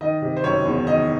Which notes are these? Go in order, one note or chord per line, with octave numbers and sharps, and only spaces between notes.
D#3 D#5
C3
C5
F#1 C#5
E2
D#3 D#5